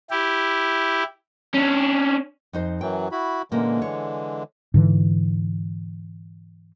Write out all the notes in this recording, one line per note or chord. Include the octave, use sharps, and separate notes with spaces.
E4 G4
C#4 D4
F2 D#4 C5
F#2 E3 F#3 G5
E4 F#4 B5
A#2 D3 E3 G#3 A#3 C#4
C#5
G#2 D3 E3